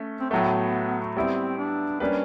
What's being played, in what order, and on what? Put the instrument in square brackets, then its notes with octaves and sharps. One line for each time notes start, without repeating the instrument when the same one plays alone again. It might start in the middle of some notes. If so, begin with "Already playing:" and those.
Already playing: [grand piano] A3 C#4
[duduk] C4
[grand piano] A2 F#3 A3 [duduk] B3
[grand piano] G3 B3 E4 [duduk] C4
[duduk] D4
[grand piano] G3 A#3 D4 G4 B4 [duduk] C#4